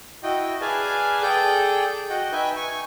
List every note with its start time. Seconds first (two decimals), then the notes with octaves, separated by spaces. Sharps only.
0.23 E4 F#4 D#5 G5
0.61 G#4 B4 D5 F5 G#5 A5
1.23 G#4 A4 D5 G5 G6
2.10 F#4 D#5 F#5 G5
2.32 D#4 B4 E5 G5 G#5
2.56 G#5 C#6